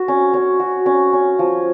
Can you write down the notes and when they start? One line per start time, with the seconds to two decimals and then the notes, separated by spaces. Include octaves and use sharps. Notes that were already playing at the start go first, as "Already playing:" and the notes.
Already playing: F#4
0.08 C#4
0.34 C#4
0.60 F#4
0.86 C#4
1.13 C#4
1.39 F3